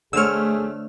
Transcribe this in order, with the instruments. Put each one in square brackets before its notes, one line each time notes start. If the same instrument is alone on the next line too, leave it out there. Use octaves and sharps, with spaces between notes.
[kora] D3 C5 C#5 [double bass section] A3 [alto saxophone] G#4 [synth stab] E6 F6